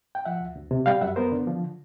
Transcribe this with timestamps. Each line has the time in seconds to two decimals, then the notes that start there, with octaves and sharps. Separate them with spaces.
0.15 G5
0.25 F3 E5 F#5
0.40 D2
0.56 D2
0.71 C3
0.86 G3 F5 G5
1.01 F#2 E5 F#5
1.16 B3 A#4 C5
1.32 D3
1.47 F3